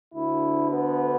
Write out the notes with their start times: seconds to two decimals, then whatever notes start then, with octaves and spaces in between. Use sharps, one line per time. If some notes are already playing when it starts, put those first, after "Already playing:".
0.13 D2 D3 E4
0.70 B3